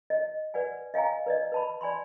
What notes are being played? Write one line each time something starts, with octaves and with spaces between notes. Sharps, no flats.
D#5
B4 D5 F#5 G#5
D#5 F5 G5 G#5 A#5
B4 D5 D#5
B4 A5 B5
D5 G#5 B5 C6